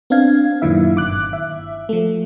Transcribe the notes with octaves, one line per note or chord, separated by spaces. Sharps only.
B3 C4 D4 F5 G#6
F#2 A#2 D3 D#3 E4 E5
G1 D6 F#6
E5
F3 A3